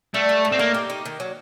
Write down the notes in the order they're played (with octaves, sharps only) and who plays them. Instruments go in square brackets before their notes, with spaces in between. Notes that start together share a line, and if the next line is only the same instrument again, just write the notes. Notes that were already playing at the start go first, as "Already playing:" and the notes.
[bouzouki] G3 [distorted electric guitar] A3
[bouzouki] G3
A2
[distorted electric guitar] C4
[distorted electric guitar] A#3 [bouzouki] D#4
[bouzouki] G4
D#4
D#3
F#3